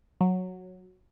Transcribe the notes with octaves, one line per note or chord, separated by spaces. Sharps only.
F#3